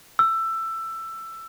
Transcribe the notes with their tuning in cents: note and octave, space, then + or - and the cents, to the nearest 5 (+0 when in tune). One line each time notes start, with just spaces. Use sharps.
E6 +15